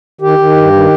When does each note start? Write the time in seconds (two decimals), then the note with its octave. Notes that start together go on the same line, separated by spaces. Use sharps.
0.21 D#3 G4
0.39 D#3
0.56 G2
0.72 D#3